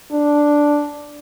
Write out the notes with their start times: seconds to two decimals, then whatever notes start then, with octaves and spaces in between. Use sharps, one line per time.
0.11 D4